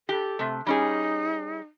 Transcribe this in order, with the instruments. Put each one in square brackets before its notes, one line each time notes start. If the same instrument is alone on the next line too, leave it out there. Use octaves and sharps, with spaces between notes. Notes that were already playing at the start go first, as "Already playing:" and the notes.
[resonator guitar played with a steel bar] G4 [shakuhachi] A4
[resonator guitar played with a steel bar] C3 A3
[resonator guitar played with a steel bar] G3 C#4 G#4 [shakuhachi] D#4